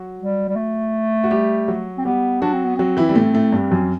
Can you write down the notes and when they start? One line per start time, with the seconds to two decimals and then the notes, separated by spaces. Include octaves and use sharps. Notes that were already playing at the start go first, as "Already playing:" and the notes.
Already playing: F#3 F#4
0.19 G3
0.48 G3
0.56 A3
1.24 F#4
1.30 G3 G4
1.68 F#3 F#4
1.98 C4
2.05 G3 B3 G4
2.41 F#3 D4 F#4
2.53 C4
2.65 B3
2.76 F#3 C4 F#4
2.97 E3 E4
3.09 G3
3.15 A2 A3
3.34 A2 A3
3.52 G2 G3
3.71 F#2 F#3